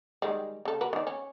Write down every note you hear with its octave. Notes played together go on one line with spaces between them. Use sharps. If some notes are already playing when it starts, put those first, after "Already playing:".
D#3 G3 G#3
C#3 A4
F#4 A#4 B4
D#3 D4
C#4